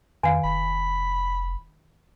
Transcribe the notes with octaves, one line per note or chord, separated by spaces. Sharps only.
F2 D#3 F5 G#5
F1 B5